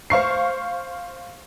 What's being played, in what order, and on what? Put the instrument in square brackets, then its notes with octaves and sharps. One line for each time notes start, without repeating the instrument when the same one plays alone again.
[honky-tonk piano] C5 F5 C#6 C7